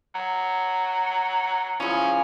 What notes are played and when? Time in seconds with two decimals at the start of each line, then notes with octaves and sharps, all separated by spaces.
0.15 F#3
1.80 F3 C#4 E4 G#4